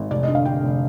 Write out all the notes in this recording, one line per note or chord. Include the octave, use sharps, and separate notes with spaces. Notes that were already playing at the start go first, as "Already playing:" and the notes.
Already playing: G#1
F1 D5
D#5
D3
F5
D3 G5
F1